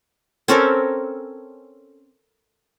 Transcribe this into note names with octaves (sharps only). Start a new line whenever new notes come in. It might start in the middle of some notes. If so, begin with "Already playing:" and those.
C4 C#4 A4 A#4